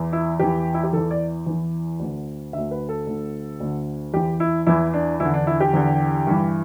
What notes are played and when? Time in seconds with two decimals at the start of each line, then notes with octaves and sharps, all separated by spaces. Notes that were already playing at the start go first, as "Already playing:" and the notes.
Already playing: E2 E3
0.13 E4
0.39 E2 E3 G4
0.74 E4
0.84 G4
0.93 E2 E3 A4
1.11 D5
1.46 E2 E3
2.00 D2 D3
2.53 D2 D3 E5
2.71 B4
2.89 A4
3.07 D2 D3
3.60 D2 D3
4.14 E2 E3 G4
4.40 E4
4.67 E2 E3 E4
4.94 D4
5.20 E2 D3 E4
5.34 D4
5.47 E4
5.60 G4
5.74 E2 D3
6.27 G2 E3